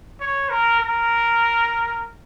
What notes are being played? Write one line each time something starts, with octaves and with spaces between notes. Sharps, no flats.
C#5
A#4
A#4